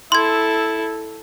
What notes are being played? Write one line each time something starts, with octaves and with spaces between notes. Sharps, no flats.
E4 A4 C6 G#6